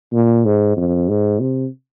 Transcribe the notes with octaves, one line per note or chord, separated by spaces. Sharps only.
A#2
G#2
F2
G#2
C3